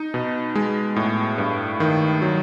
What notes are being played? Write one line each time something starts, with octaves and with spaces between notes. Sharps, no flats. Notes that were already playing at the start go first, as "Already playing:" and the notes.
Already playing: D#4
B2
G#3
A2
G2
D#3
F#3